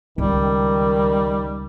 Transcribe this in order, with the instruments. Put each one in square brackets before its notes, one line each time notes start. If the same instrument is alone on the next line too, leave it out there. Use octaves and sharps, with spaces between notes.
[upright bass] C#2 [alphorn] D#3 [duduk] G3